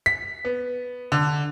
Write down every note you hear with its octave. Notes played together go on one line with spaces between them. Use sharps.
B6
B3
D3